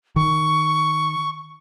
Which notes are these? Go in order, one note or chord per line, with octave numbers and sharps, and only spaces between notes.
D#3 C#6